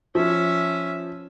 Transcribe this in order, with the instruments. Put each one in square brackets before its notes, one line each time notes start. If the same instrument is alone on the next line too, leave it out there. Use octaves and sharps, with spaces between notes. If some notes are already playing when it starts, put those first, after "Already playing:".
[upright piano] F3 [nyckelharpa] C#4 E5